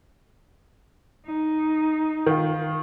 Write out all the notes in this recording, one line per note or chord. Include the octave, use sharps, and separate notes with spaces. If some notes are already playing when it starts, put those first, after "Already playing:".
D#4
D#3 F4